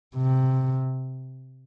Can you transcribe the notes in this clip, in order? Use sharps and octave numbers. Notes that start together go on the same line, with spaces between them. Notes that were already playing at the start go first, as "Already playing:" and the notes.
C3